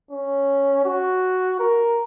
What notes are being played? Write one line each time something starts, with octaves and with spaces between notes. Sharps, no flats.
C#4
F#4
A#4